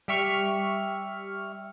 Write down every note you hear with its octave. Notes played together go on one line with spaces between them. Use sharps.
G3 G4 E5 C#6 F6